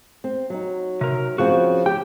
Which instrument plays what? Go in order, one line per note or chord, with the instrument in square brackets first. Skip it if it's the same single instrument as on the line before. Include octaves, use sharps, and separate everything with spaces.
[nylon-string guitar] C4
F#3 D#4
[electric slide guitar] C3 A#4
[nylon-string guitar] C#3 F3 C4 [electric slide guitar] F#4
[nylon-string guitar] G4 [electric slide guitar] G5